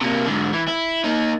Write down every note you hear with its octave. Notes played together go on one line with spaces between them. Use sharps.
C3 A#3
G#2 D3
E3
E4
A#3 D#4